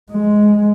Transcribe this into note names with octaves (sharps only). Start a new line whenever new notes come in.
G#3